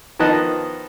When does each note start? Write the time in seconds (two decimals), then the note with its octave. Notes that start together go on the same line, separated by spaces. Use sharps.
0.19 D#3 F3 B3 D#5 A5 F#6